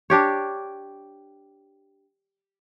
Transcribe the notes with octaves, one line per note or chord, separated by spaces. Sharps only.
D4 G4 C#5